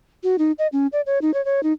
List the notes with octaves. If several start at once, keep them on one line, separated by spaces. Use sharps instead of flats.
F#4
D#4
D#5
C#4
D5
C#5
D#4
C#5
C#5
D#4